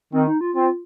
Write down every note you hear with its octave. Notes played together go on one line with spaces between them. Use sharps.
D#3 C4
D#4
F4
C4 F4